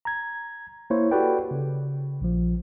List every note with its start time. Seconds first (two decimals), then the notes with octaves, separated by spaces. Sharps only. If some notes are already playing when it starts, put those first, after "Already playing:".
0.05 A#5 G#6
0.90 A#3 E4 C5 C#5
1.11 F#4 G4 A4 B4 D5 G5
1.51 C#3
2.21 A#1 F3